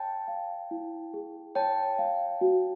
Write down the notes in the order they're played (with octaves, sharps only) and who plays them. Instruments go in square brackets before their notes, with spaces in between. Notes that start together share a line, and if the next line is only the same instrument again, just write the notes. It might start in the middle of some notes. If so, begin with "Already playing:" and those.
Already playing: [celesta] C#5 [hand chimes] G5 A5
[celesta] F5
E4
G#4
[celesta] C#5 [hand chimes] G5 A5
[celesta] F5
F#4